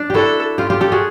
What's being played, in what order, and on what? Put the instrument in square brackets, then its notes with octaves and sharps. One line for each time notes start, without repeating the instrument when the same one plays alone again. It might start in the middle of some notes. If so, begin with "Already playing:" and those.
Already playing: [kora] D4
[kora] E4 F#4 G4 [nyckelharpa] A4
[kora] F4 G4
F4 G4
G4 A4
F#4 G#4